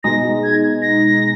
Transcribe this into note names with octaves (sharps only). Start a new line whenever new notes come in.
B2 G#3 D#4 A#6
G#6
A#6